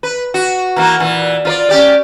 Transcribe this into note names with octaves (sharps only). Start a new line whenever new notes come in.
B4
F#4
E3 A#3 F#4
A#2 E3
F4 B4 D5
C#4 G4 D5